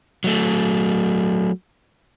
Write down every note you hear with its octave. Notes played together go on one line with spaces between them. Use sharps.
F#3 A3